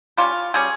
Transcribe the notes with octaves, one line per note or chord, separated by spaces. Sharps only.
G3 C#4 F4
G3 C#4 G#4